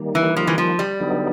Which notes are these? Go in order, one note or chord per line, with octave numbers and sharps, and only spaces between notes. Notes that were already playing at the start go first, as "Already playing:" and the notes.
Already playing: D#3 G3 A#3
E3
F3
E3
F3
G3
D3 F#3 B3 D#4